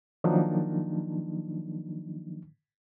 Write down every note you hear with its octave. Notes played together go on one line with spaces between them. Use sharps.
D#3 F3 F#3 A#3 D4 D#4